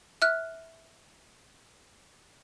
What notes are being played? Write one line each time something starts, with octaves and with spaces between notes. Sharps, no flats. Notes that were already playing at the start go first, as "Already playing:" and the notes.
E5 F6 F#6